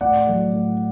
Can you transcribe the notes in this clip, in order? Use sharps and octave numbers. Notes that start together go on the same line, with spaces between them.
A2 D5 F#5
F#3 A3
A2